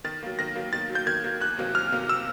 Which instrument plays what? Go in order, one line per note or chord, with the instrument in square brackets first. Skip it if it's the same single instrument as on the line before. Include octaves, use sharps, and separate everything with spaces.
[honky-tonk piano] D#3 [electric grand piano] A6
[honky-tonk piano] F#3 A#3
[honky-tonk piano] D#3 [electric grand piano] A#6
[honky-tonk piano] F#3 A#3
[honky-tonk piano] D#3 [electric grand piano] A6
[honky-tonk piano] F#3
[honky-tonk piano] A#3 [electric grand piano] G6
[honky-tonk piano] D#3 [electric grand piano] G#6
[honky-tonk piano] F#3 A#3
[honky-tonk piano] E2 [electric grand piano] F#6
[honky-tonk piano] C3 D#3 F#3 A#3
[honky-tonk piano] E2 [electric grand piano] F6
[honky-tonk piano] C3 D#3 F#3 A#3
[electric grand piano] E6